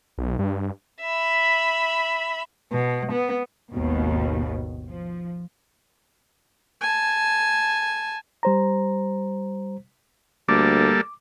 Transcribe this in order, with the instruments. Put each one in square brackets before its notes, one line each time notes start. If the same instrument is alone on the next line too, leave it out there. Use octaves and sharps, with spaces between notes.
[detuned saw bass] B1
G2
[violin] E5 B5
[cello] B2
B3
[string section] G#1 D#2 B2
F3
[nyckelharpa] G#5 A5
[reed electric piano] G3 C5 A#5
[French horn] D2 [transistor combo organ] G3 A#3 A4 [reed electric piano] D6